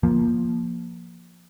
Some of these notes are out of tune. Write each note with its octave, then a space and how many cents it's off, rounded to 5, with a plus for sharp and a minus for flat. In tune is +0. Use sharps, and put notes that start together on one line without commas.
F3 +0 A#3 +15